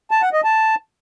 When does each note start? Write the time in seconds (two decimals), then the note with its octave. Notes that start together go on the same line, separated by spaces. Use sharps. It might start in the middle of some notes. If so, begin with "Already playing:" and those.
0.11 A5
0.22 F#5
0.33 D#5
0.44 A5